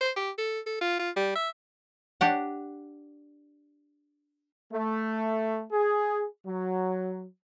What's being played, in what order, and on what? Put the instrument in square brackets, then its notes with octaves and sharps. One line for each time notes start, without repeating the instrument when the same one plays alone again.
[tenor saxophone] C5
G4
A4
A4
F4
F4
G3
E5
[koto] D4 G4 F#5
[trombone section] A3
G#4
F#3